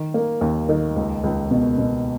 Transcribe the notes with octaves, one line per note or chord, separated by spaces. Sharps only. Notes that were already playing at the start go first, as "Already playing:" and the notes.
Already playing: D#3
A#3
D#2
D#3
C#2
C#2
B2
B2